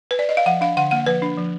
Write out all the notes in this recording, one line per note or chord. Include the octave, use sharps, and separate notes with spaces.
B4
D5
D#5
F5
F3 F#5
D4 F5
D3 F#5
A#3 F#5
F3 B4
D4
F3